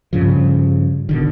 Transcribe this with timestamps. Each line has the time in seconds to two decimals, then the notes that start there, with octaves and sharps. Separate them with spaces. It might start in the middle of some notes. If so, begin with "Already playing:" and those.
0.13 G2 C#3 F3
1.09 B2 D3 D#3